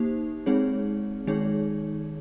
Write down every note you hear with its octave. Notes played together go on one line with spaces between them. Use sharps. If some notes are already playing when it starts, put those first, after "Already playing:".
Already playing: A#3 D#4 G4 C5
G#3 C4 D#4 G#4 C#5
D#3 G#3 D#4 G#4 C#5